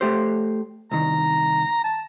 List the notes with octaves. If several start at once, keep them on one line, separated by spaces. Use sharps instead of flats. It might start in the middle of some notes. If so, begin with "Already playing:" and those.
A3 G4 C5
C2 D#3 A#5
A5